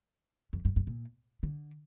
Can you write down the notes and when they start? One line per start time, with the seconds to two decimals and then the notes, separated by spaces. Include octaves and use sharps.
0.53 F2
0.65 G2
0.76 G2
0.87 A#2
1.43 D3